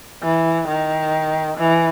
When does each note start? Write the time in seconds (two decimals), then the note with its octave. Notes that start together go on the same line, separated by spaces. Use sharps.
0.23 E3
0.68 D#3
1.58 E3